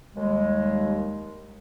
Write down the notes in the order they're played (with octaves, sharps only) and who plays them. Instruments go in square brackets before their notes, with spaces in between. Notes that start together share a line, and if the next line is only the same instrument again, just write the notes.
[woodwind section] D#2 G3 G#3